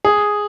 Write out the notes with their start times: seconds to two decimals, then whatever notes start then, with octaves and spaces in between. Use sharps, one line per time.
0.05 G#4